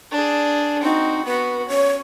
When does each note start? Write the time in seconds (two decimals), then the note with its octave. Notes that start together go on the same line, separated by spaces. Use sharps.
0.12 D4 G#4
0.83 C4 D#4 F#4
1.25 B3 F#4 B4
1.68 C#4 C#5